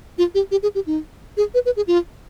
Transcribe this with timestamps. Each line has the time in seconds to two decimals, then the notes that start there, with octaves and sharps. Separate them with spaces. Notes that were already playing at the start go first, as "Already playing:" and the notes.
0.18 F4
0.35 G4
0.51 G4
0.63 G#4
0.75 G4
0.87 D#4
1.37 G#4
1.54 B4
1.66 B4
1.77 G#4
1.87 F4